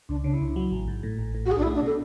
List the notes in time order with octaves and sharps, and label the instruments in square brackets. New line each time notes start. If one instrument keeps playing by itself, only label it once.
[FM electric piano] C#2 [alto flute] D4
[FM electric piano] C#3 [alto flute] D4
[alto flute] E4
[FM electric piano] C#2
F#3
A1
G#2
A2
A1
A2
[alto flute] F#4
[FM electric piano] B1 [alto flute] G#4
[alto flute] D4
E4
[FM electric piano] A3
[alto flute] D4
[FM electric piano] B2 [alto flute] A4